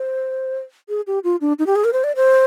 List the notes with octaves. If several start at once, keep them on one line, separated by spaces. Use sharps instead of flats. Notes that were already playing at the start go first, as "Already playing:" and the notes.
Already playing: C5
G#4
G4
F4
D4
D#4
G4
G#4
A#4
C5
D5
C5